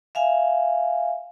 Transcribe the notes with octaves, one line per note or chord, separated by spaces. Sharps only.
E5 F5 G#5